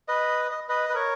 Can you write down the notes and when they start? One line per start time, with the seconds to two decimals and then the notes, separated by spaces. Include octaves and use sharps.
0.08 B4 D#5
0.51 D#5
0.69 B4 D#5
0.89 B4
0.95 A#4 C#5